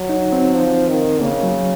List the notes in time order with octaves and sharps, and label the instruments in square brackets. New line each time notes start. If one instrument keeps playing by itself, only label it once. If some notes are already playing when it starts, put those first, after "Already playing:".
Already playing: [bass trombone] F#3
[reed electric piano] D#4
C4
[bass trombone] F3
D#3
[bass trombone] C#3 [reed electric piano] A#3
[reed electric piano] F#3